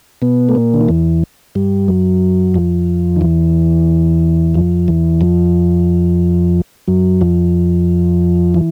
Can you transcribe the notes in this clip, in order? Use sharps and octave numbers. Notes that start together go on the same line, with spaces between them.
B2 B3
A3
A#2 A#3
D3
D#3
E2 E3
G2 G3
F#2 F#3
F2 F3
D#3
E2 E3
F2 F3
E2 E3
F2 F3
F#2 F#3
F2 F3
E3